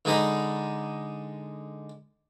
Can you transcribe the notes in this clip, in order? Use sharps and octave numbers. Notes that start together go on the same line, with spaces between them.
D3 G#3 D#4 A#5 B5